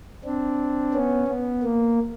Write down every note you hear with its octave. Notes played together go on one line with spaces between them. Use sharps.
C4 D4
B3 C#4
B3
A#3